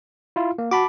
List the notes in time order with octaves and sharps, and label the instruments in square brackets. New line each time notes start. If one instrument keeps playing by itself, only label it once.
[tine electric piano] E4 F4
A#3
[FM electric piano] F#4 [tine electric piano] A5 B5 D6